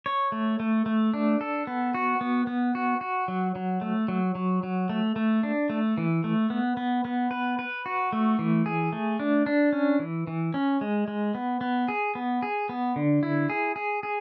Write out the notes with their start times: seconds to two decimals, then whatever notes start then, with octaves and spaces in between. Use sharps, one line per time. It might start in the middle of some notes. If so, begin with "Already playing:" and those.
0.06 C#5
0.32 A3
0.60 A3
0.86 A3
1.14 D4
1.41 A4
1.67 B3
1.94 F#4
2.21 B3
2.47 B3
2.75 F#4
3.01 F#4
3.28 F#3
3.55 F#3
3.81 A3
4.08 F#3
4.35 F#3
4.63 F#3
4.89 A3
5.16 A3
5.43 D4
5.70 A3
5.98 E3
6.24 A3
6.50 B3
6.77 B3
7.05 B3
7.31 B4
7.59 B4
7.86 F#4
8.13 A3
8.39 E3
8.66 G#4
8.93 A3
9.20 D4
9.46 D4
9.73 C#4
9.99 E3
10.27 E3
10.54 C#4
10.81 G#3
11.08 G#3
11.35 B3
11.61 B3
11.88 G#4
12.15 B3
12.42 G#4
12.69 B3
12.96 D3
13.23 E4
13.50 G#4
13.76 G#4
14.03 G#4